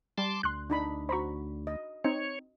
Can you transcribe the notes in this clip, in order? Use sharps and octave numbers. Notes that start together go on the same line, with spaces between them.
G3 A5 C6 D6
D2 C6 F#6
D4 D#4 B5
F#4 C5 A#5 B5 C#6
D#5
C4 D#4 C#5